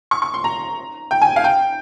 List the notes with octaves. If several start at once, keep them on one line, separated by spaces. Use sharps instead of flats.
C#6
C#6
C6
A#5
G5
G#5
F5
G5